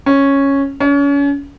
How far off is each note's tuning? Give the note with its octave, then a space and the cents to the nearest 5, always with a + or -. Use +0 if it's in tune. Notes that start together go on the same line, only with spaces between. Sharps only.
C#4 -5
C#4 +35